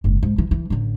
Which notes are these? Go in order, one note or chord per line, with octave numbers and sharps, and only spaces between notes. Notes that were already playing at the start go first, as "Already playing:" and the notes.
F#1 G#2
G#2
E3
E3
A1 D3